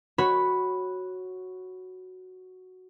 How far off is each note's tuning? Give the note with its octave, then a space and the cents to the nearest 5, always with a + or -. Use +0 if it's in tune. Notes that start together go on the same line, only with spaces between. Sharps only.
F#4 +0 C#5 -10 B5 +0